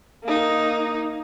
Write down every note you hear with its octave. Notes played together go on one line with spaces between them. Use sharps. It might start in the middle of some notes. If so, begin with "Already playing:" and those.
A#3 D#4